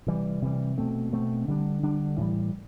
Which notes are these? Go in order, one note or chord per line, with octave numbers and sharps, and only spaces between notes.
C3 E3 G3
C3 E3 G3
B2 A3 C4
B2 A3 C4
D3 G3 D4
D3 G3 D4
A2 E3 G3